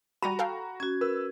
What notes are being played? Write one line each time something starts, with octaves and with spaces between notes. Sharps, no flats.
G3 F#4 A#5 B5 A#6 D#7
A4 F5 G5
C#4 F#4 G#6
A#4 B4 E6